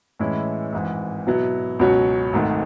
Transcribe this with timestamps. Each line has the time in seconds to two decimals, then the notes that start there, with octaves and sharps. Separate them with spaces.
0.19 A2 E3 G#3 C#4 E4
0.73 G#1 G#2 E3
1.27 B2 F#3 B3 E4
1.79 C#2 B2 F#3 C#4 F#4
2.32 G#1 G#2 D#3 A3